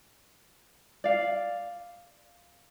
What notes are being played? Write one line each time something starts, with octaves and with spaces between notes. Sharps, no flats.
D5 F5